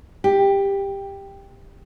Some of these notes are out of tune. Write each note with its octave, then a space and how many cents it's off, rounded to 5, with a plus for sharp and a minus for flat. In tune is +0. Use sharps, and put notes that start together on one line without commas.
G4 +10